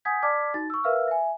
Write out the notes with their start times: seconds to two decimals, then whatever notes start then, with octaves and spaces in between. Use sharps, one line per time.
0.05 F#5 G#5 D#6 G6 G#6 B6
0.22 D5 A5 D6 F6 G#6 B6
0.54 D#4 F#4 A6
0.70 C#6 E6
0.84 A#4 B4 E5 F5 E6 F6
1.08 E5 G#5